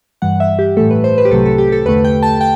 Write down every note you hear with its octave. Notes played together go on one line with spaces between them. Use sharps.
G2 E3 G3 F#5
E5
G4
A2 E3 A3 A4
B4
C5
B4
G4
C2 C3 F#3 A3 A4
A4
G4
A4
E2 D3 A3 B4
G5
A5
G5